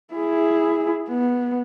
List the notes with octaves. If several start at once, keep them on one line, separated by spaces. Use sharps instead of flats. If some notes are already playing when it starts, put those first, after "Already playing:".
E4 G#4
B3